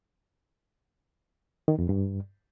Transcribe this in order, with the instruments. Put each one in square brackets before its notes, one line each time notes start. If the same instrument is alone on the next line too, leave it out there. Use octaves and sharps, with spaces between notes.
[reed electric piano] D#3
F2
G2